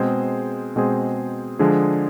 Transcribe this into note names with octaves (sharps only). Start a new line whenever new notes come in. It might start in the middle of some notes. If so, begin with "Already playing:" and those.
Already playing: B2 G#3 C4 G#4 C5
B2 G#3 C4 G#4 C5
D3 F3 G#3 D4 G#4